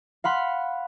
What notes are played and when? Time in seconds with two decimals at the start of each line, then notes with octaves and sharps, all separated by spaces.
0.24 F5 F#5 B5 C6